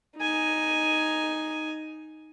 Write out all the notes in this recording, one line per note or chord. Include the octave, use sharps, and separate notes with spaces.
D#4 G#5